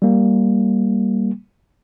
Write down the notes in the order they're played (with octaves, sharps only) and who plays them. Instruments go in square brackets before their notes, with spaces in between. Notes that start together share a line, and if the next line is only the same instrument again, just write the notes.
[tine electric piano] G3 A#3